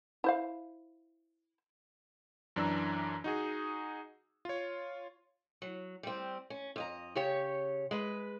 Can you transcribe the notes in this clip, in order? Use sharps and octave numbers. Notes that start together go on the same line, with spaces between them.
E4 C5 F5
F#2 E3 D4 A#5 E6
D#4 F#4 G#4
F4 C#5
F#3
G3 C4
C#4
F2 D#5 A#5
C#3 G4 C#5
G#3 B4